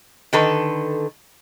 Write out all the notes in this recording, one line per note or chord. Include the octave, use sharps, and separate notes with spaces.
D3 D#3 A4 B4